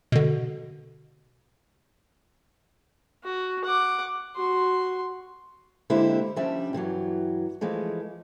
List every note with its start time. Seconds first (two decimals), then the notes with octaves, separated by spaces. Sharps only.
0.12 B2 D3
3.24 F#4
3.64 F#5 D6
4.36 F#4 C6
5.90 D3 G#3 A#3 E4 G4 C5
6.36 F3 G3 C#4 D4 E5
6.73 G2 D3 E3 F#3
7.61 E3 F3 G#3 A3